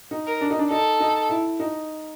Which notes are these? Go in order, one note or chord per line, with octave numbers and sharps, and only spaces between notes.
D#4
A#4
D4
D#4
D4
D#4 A4
D#4
E4
D#4